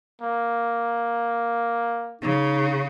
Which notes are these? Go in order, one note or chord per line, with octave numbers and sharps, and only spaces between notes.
A#3
C#3 D#4